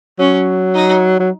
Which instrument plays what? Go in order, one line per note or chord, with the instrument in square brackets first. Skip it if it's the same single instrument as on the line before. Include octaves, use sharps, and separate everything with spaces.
[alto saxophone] F#3 [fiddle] C#4
[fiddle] D#4
[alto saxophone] F#3